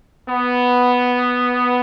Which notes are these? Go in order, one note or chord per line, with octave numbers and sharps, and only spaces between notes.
B3